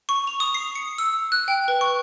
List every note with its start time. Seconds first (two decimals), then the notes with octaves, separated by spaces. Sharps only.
0.09 C#6
0.27 F7
0.40 D#6
0.55 C7
0.75 C#7
0.98 E6
1.32 F#6
1.48 G5
1.68 B4
1.81 C#6